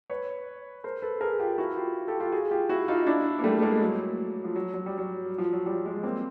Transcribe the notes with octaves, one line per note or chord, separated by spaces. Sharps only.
B4 C#5
A#4 C5
A4 B4
G#4 A#4
F4 G4
E4 F#4
F4 G4
G4 A4
F4 G4
F#4 G#4
F4 G4
E4 F#4
D#4 F4
D4 E4
A#3
G3 A3
A3
G#3 A#3
F#3
F3
F#3
F#3
G3
F#3
F3
F#3
F3 G3
F#3 G#3
A#3 C4